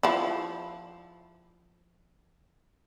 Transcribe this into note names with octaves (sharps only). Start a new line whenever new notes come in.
F3 E4